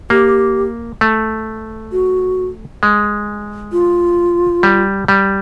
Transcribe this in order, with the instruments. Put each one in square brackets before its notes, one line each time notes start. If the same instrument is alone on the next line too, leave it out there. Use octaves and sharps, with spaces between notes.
[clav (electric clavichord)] A#3 [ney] G4
[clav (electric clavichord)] A3
[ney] F#4
[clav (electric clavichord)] G#3
[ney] F4
[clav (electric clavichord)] G3
G3